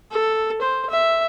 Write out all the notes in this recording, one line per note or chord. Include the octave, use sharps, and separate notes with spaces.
A4
C5
E5